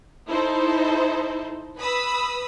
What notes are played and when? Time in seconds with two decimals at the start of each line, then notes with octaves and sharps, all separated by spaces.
0.28 D#4 E4 A4 C5
1.80 B4 B5 D#6 E6